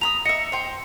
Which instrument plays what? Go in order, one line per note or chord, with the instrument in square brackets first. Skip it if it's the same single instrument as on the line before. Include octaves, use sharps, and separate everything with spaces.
[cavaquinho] A#5 B5 D#6 [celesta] F7
[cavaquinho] D#5 E5 [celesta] C#7
[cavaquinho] C5 G5